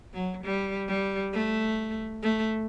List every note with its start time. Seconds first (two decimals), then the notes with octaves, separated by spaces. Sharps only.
0.14 F#3
0.44 G3
0.88 G3
1.33 A3
2.23 A3